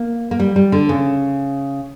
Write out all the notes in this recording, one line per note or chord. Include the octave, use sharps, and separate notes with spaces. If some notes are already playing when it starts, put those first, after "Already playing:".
Already playing: A#3
A#3
G3
G3
D3
C#3